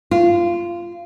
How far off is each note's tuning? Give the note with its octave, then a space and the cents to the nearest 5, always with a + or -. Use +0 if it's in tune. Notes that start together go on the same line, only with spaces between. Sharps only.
F4 -20